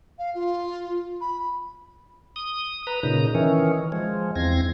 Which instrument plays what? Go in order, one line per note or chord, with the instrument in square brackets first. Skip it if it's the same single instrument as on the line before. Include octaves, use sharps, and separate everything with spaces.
[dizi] F5
F4
B5
[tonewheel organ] D#6
B4 A#5
A#2 C#3 D#4 A#5
D#3 E3 C#4
F3 G#3
E2 C4 G#6 A#6